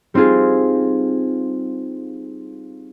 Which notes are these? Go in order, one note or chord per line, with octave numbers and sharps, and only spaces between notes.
G3 C4 D#4 F4 G#4